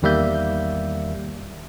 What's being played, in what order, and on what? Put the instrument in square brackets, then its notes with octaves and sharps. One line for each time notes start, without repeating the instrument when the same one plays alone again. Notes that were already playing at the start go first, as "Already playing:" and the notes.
[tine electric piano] E2 D#3 G3 A#3 E5 G6